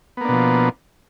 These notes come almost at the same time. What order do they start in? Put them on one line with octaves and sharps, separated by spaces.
B3 A#3 D4 B2 F3